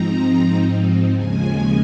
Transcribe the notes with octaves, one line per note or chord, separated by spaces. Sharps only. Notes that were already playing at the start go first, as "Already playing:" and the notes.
Already playing: G#2 F3 C4 D#4 A#5
D#2 C#3 F3 G#3 G#5